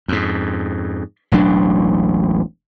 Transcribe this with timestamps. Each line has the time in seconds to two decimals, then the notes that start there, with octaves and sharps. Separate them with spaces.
0.08 F2 G#2
1.32 E1 A1 F#3 D4